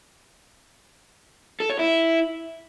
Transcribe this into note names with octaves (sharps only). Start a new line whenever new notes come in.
A4
C#5
E4